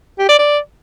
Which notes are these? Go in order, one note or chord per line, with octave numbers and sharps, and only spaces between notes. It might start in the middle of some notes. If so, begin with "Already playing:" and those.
G4
D5
D5